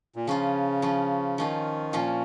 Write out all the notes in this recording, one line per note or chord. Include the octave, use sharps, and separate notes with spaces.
A#2
C#3 F3 C#4 F4
F3 C#4 F4
D#3 F3 C#4 F4
A#2 F3 C#4 F4